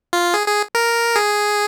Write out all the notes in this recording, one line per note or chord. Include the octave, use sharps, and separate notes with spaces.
F4
G#4
G#4
A#4
G#4